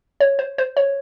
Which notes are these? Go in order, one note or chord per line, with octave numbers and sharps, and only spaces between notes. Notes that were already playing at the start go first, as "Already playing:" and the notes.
C#5
C5
C5
C#5